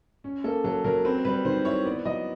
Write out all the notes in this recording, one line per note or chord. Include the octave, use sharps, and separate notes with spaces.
C#4
A#3 A4
F#3 A4
F#3 A#4
C4 B4
G3 B4
D#3 C5
E4 C#5
B3 D5
F#3 D#5